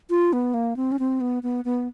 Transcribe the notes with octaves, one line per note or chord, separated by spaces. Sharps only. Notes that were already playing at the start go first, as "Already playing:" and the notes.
F4
B3
A#3
C4
C#4
C4
B3
B3
B3